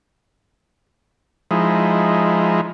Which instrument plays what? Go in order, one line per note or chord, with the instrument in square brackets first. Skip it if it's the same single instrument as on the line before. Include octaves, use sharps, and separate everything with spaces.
[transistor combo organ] F3 G#3 D#4 E4